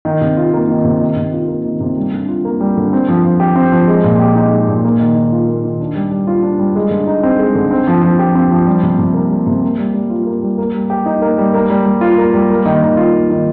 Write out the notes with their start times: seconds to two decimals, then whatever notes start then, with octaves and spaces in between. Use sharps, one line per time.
0.05 D#3
0.21 C3
0.37 F4
0.53 A#3
0.69 D#3
0.85 C3
1.01 D#3
1.16 C3
1.33 F4
1.48 A#3
1.65 D#3
1.81 C3
1.97 G3
2.13 D3
2.29 F4
2.45 A#3
2.61 G3
2.77 D3
2.93 C4
3.08 F3
3.24 F3
3.40 G4
3.56 C4
3.72 F3
3.87 G#3
4.04 A#2
4.19 G4
4.35 D#4
4.51 G#3
4.68 A#2
4.84 A#3
4.99 D#3
5.15 D#3
5.32 F4
5.47 A#3
5.64 D#3
5.80 D4
5.95 G3
6.11 G3
6.27 F4
6.43 D4
6.59 G3
6.76 G#3
6.91 D3
7.07 D#4
7.23 C4
7.39 G#3
7.55 D3
7.71 C4
7.87 F3
8.03 F3
8.19 G4
8.35 C4
8.51 F3
8.67 G3
8.83 C3
8.99 C3
9.14 A#3
9.30 G3
9.47 C3
9.63 A#3
9.78 G3
9.94 G3
10.10 F4
10.26 A#3
10.42 G3
10.58 A#3
10.75 G3
10.90 G4
11.06 D#4
11.22 A#3
11.38 G3
11.54 A#3
11.70 G3
11.86 G3
12.01 F4
12.18 A#3
12.34 G3
12.50 A#3
12.65 D#3
12.82 D#3
12.97 F4
13.14 A#3
13.30 D#3